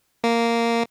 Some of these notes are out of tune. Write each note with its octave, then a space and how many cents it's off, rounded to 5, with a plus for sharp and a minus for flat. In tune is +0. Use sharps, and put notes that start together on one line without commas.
A#3 -5